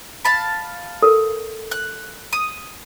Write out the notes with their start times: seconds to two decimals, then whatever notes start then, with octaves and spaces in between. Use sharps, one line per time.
0.25 F5 A5 B5
1.02 A4 A#4
1.71 F#6
2.33 D#6